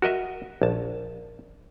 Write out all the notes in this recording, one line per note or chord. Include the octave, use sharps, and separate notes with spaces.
F#4 A#4 D#5 E5
A#1 A5